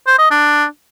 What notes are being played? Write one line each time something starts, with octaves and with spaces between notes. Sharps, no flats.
C5
D#5
D4